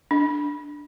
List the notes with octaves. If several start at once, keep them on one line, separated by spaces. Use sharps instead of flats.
D4